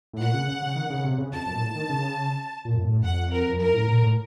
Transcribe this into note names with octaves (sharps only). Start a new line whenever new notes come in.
A2
A#2 F#5
C#3
C#3
C#3
D#3
C#3
C3
C#3
F2 A5
F#2
A#2
A2
D#3
C#3
A#2
F#2
A2
F2 F#5
A#4
F2
F#2 A#4
A2
A#2
A2